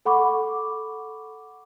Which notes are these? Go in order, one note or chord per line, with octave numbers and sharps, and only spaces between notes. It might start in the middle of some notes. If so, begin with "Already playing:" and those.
A4 F#5 B5 C#6 D6